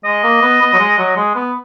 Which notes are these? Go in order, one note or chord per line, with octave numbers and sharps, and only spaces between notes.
G#3 D#5
A#3
B3
B3
F#3
G#3
F#3
G#3
B3